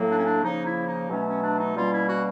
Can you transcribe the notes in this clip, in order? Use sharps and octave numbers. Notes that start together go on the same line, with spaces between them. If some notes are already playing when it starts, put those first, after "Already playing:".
Already playing: A2 F#3 A#3
D4
C#4
D4
C#3 F3 A#3 C#4 D#4
E4
D#4
B2 F#3 A3 C#4
C#4
D4
D#4
B2 G3 A#3 C#4 F4
E4
F#4